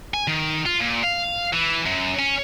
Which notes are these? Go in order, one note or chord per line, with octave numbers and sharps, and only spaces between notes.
G#5
D#3
F4
A#2
F5
E3
F#2
C#4